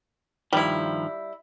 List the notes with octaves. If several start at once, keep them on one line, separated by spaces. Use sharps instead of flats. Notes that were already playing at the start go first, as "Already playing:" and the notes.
G2 D#3 F3 G3 E4